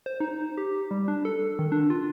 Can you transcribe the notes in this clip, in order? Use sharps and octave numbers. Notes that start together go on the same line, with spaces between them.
C5
D#4
G4
G3
D4
A4
D#3
D4
F4